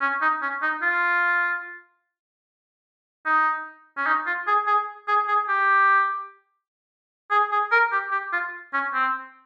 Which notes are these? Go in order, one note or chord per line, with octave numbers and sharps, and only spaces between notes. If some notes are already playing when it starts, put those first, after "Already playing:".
C#4
D#4
C#4
D#4
F4
D#4
C#4
D#4
F4
G#4
G#4
G#4
G#4
G4
G#4
G#4
A#4
G4
G4
F4
C#4
C4